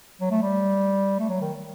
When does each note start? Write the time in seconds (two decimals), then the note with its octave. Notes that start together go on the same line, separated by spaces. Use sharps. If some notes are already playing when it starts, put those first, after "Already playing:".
0.21 F#3
0.31 A3
0.42 G3
1.19 A3
1.29 F#3
1.41 D#3